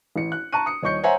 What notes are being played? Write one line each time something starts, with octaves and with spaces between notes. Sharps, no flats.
A1 C#7
F#6
A5 A#5 C#6 F#6 D#7
D#6 C#7
D#1 C#5 D#5 C#6 G6 C#7
C5 C#5 E5 F#5 G#5 A#5